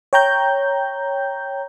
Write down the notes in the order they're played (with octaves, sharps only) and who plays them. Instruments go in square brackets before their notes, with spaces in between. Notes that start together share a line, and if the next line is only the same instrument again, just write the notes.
[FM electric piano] C#5 G5 A#5 G6